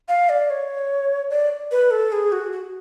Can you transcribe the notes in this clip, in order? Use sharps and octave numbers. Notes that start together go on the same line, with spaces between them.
F5
D5
C#5
D5
B4
A4
G#4
F#4
F#4